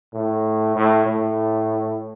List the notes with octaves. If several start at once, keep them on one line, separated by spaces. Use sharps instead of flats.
A2
A2
A2